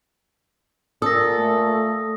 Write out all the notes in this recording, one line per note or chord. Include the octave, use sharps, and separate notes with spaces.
A#2 A4 D#6 A#6
A3